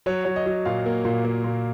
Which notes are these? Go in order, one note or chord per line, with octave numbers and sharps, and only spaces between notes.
F#3 C#5
F#3 C#5
D#5
F#3
A#2 F5
A#3
A#2
A#3
A#2